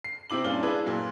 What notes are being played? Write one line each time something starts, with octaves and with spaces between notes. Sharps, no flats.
C7
C3 C4 E4 D6 F#7
G2 A#2 C#4 D4 F5 G7
D4 E4 G#4 B4
A#2 F#3